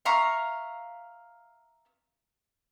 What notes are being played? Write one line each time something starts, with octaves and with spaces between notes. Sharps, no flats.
E5 F5 A#5 C#6